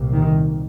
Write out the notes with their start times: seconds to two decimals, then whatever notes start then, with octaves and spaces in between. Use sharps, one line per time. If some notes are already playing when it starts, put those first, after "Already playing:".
Already playing: C2 A#2
0.13 D#3